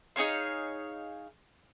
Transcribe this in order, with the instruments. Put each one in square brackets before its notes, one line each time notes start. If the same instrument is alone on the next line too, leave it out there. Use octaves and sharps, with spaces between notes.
[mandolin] D#4 G#4 C#5 F5